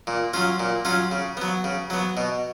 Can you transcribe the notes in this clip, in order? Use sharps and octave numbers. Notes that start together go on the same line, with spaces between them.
A#2
F#3 C#4 F4
A#2
F#3 C#4 F4
C#3
F#3 B3
C#3
F#3 B3
B2